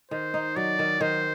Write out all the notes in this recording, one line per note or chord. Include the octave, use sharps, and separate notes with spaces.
D#3 C5
D#4
F#3 D5
D#3
D#3 C5